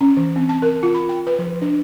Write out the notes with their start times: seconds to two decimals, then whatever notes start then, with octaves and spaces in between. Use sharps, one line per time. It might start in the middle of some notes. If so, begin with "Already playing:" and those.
0.01 C#4
0.17 E3
0.36 C4
0.49 A5
0.62 A#4
0.83 F4
0.94 B5
1.09 G5
1.27 B4
1.39 F3
1.62 D4